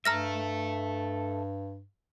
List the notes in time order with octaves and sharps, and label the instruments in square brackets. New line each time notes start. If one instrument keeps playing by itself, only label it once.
[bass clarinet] G2 [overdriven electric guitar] A4 E5 [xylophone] A#5 F6 A#6